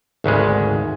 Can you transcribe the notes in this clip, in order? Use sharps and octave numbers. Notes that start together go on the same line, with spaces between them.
G#1 D2 C#3 G#3